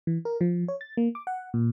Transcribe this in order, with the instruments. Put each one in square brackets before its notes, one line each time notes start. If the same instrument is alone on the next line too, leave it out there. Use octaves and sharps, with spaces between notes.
[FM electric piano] E3
A#4
F3
C#5
A6
A#3
D6
F#5
A#2